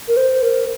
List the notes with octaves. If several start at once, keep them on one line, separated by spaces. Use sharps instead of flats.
A#4
C5
A#4